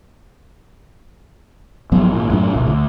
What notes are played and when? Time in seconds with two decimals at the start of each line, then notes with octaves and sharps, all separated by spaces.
1.92 G#1 F3 F#3 B3
2.13 G#1 A#2
2.30 F#2 A2 D4
2.54 D1 G#1 B2
2.67 D2